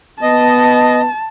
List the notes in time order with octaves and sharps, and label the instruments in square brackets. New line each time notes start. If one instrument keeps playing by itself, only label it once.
[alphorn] B3 [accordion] D#5 [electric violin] A5